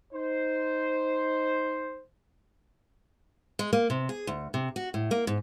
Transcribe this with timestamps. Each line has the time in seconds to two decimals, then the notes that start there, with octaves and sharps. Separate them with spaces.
0.13 D#4 C5
3.59 G#3
3.73 A#3
3.90 C3
4.09 G#4
4.27 D2
4.54 C3
4.76 F#4
4.94 A2
5.11 A#3
5.27 G#2